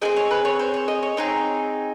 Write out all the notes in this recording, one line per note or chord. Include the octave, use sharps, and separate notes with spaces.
C4 E4 G#4 D#5
C#5
B4
C#5
C5
C#5
D#5
C#5
C4 D#4 G#4